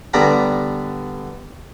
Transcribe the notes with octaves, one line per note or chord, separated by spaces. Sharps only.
D3 G3 B3 D5 A#5 B5